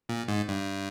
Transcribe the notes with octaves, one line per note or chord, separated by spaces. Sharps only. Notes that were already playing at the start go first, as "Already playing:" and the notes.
A#2
G#2
G2